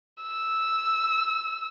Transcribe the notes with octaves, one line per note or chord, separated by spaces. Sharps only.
E6